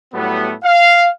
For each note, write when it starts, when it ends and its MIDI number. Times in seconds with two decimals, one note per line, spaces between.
0.14 0.53 45
0.14 0.53 54
0.14 0.53 55
0.14 0.53 57
0.14 0.53 59
0.64 1.09 77